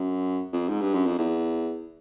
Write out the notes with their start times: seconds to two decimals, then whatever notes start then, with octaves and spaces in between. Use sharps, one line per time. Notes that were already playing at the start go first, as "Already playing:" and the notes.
Already playing: F#2
0.52 F2
0.69 G#2
0.81 G2
0.94 F#2
1.06 F2
1.19 E2